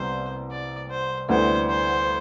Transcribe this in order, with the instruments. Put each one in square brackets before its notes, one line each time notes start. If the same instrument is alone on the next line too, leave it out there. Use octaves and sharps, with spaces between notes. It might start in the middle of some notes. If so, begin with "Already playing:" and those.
Already playing: [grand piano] C2 C3 G3 B3 [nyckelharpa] C5
[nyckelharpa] D5
C5
[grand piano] D2 D3 G3 B3 E4 [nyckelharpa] C5
[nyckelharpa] C5